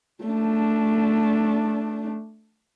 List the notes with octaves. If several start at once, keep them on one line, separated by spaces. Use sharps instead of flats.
A3 D4